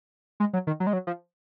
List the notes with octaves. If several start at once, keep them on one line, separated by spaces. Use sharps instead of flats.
G#3
F#3
D#3
F#3
G#3
F#3
F3